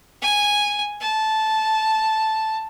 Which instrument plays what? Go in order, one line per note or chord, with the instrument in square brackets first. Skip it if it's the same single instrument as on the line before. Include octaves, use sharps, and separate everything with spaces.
[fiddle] G#5
A5